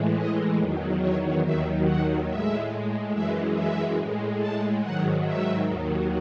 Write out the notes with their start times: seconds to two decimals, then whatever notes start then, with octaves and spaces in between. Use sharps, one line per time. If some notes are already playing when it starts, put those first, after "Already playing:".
Already playing: A2 E3 G#3
0.16 D#5
0.59 E2 D#3 F#3
1.01 C#5
1.43 D#2 D#3 F#3 E5
1.86 F#5
2.28 A2 G#3 E5
3.13 F#2 E3 G#3 E5
3.55 E5
3.98 A2
4.03 G#3
4.40 A5
4.82 G#2 D#3 F#3 F#5
5.24 E5
5.67 D#2 D#3 F#3